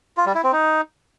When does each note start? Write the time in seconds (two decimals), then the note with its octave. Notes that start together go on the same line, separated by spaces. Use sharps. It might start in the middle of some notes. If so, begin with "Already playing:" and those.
0.17 F4
0.26 G3
0.35 E4
0.44 C4
0.53 D#4